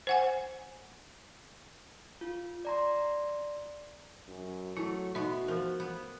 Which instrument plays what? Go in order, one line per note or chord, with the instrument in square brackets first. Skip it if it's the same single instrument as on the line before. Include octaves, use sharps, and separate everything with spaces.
[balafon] C5 F#5 G#5
[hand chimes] F4
D5 A#5 C6
[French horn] F#2
[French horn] F#3 [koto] A3 [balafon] E4
[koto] B2 B3 [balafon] D#4 E5 [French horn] F#4
[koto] F3 [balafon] A#4
[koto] B3